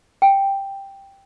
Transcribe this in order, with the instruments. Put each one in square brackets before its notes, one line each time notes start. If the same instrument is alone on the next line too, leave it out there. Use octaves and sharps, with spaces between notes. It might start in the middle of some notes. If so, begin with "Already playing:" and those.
[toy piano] G5